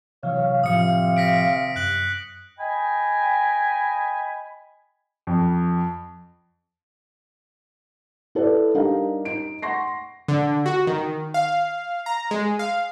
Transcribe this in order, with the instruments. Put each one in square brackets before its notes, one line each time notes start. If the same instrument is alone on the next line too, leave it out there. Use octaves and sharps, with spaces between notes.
[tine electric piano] C3 E3 F#3 [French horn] C#5 [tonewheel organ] F5
[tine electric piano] A2 D#3 F3 [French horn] C3 [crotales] D#6 C#7
[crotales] A#6 B6 D7
[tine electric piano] F#2 [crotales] F#6 F#7
[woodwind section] D#5 G5 G#5 B5
[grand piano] F2
[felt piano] E4 A4 B4 D5
G3 D4 D#4 G4 A#4 F5
D#4 D7
F#5 C6 C#6 A#6 C7
[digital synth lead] D3
F#4
D#3
F5
A#5
G#3
F5